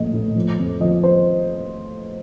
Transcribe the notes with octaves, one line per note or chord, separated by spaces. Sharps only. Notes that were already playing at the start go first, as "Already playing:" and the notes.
Already playing: A#1 A2 D#5
A2
F3
F2
F3 D#5
F3 C5